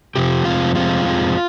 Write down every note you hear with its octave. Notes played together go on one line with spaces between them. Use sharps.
F2 C3 F3 G4
F2 C3 F3 G#3 F4
F2 C3 F3 G#3 F4
F2 C3 F3 G#3